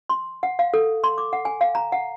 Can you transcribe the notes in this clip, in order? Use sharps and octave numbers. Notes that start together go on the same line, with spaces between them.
C6
F#5
F5
A4
C6
D6
F#5
G#5
F5
A#5
F#5